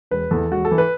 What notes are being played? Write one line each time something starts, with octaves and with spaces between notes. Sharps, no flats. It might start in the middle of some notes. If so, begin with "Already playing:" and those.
E1 B4
E2 E3 A4
E1 F#4
A4
E3
B4